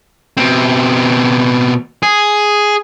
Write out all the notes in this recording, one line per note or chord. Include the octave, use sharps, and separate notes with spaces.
B2 C4
G#4